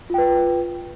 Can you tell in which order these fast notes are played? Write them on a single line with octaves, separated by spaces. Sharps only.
F4 G5 B4